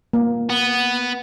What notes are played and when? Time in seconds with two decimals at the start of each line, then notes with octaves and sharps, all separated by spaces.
0.13 A#3
0.50 B3